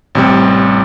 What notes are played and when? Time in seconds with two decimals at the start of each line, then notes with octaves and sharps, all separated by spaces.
0.15 A1 C3 G3